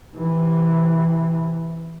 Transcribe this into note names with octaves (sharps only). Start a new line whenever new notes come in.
C3 E3